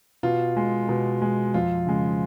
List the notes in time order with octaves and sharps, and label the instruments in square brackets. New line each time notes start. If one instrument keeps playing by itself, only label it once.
[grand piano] B2 F4
G#3
B2
G#3
F2 F4
C#3 G#3